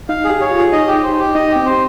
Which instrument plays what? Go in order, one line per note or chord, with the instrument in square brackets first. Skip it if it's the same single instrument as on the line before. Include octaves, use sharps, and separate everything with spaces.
[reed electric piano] D#4 [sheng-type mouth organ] F5
[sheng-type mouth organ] G#4
[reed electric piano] G4
[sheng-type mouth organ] C#5
[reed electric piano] F4
[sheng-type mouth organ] G#4
[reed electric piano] D#4 [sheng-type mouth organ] D#5
[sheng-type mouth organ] G4
C5
G4
[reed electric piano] D#4 [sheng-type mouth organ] D#5
[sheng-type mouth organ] G4
[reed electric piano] C4
[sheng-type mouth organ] C5